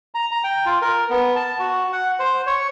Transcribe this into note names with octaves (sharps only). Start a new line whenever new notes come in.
A#5
A#5
G5
F4
A#4
B3
A5
F#4
F#5
C5
C#5